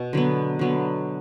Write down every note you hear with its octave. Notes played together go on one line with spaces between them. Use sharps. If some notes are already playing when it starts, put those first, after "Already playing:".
Already playing: B2
D3 F#3 B3
D3 F#3 B3